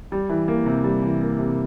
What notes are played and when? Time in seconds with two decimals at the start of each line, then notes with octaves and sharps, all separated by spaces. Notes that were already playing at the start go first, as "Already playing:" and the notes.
0.12 G3
0.29 E3
0.48 A#3
0.66 C3
0.84 G3
1.02 E3
1.21 A#3
1.39 C3